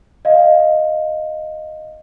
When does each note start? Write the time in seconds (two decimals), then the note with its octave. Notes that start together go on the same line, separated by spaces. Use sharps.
0.25 D#5 F5